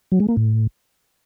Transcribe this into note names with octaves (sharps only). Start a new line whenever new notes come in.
F#3
G#3
A#3
A2